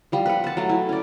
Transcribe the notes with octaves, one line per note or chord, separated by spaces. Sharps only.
F3 G3
B4 F#5
F#5 A5
F#3 A3
E4
C#4 D5